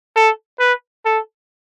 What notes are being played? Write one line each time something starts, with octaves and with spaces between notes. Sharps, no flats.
A4
B4
A4